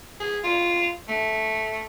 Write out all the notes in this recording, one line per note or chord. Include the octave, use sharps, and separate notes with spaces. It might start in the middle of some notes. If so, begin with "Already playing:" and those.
G#4
F4
A3